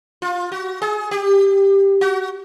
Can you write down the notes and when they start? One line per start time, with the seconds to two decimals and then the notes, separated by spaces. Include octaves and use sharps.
0.22 F4
0.52 F#4
0.82 G#4
1.11 G4
2.01 F#4